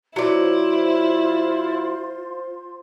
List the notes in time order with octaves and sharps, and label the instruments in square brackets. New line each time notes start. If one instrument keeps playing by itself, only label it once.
[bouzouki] F#3 D5 [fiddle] E4 [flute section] F4 C5 C6